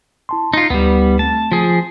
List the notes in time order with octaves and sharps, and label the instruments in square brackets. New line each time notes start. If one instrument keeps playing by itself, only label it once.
[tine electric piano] E4 A5 C6
[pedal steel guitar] D#4 F4 [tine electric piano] C6
[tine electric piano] D2 D#4 [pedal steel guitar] G3 B3
[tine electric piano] A3 C4 [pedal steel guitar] A5
[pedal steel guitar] F3 G#4